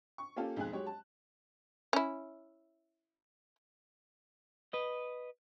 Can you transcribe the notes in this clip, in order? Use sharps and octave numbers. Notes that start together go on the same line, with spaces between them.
C#6
A#3 C#4 F4 G4 A4 F5
B1 F2 G#3 G#4 G#5 F#6
F#3 G#3 G4 C#5
A5
C#4 E4
B4 D#5